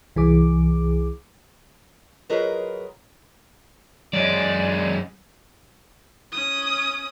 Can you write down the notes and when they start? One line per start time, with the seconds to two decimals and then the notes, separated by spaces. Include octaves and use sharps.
0.16 C2 E3 G#4 D6
2.30 F#3 F4 G#4 A#4 B4 D#5
4.13 F#2 G#3 D5
6.32 C#4 D#6